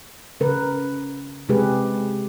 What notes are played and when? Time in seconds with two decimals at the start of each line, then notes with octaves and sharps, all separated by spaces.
0.40 C#3 A#4 B4
1.49 C3 G#3 G4 G#4 B4